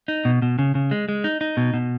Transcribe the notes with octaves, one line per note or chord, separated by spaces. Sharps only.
D#4
B2
B2
C#3
C#3
G#3
G#3
D#4
D#4
B2
B2